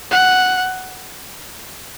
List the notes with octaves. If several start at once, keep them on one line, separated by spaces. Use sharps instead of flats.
F#5